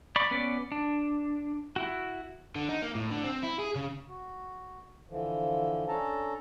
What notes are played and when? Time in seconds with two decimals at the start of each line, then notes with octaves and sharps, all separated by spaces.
0.16 D5 B5 C#6
0.31 B3 C#4 B4 D5
0.72 D4
1.76 E4 F#4
2.55 D3
2.69 D#4
2.82 A#3
2.95 A2
3.11 D3
3.24 C4
3.43 E4
3.59 G#4
3.75 C#3
4.09 F#4
5.10 D3 E3 F3
5.88 C#4 D4 A4 A5 A#5